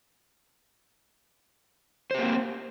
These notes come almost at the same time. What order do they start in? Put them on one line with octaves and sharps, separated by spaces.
C5 G4 A#3 C4